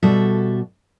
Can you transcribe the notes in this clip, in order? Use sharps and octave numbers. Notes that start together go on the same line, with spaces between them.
B2 G3 F#4 A4 E5